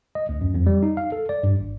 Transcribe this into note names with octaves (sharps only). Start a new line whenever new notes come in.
D#5
D2
F#2
F2
G3
D#4
F5
A4
D5
G2
G#1